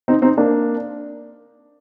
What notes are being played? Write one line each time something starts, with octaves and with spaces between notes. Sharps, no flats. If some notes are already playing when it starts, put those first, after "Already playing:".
C4 D#4
C4 D#4
A#3 D4